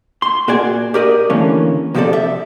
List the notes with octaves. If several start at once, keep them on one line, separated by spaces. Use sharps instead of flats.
C6
A#2 F#4 G#4 D5 G#5
G4 A#4 D5 D#5
D3 E3 A3 A#3 C#4
C3 F3 C4 G4 A4 D5
E5